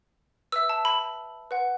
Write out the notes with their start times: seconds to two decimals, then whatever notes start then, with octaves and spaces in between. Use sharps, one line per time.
0.52 B4 E5 E6
0.69 A5
0.85 B5
1.51 B4 F#5